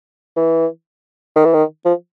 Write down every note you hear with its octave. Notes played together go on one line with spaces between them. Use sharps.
E3
D#3
E3
D#3
F3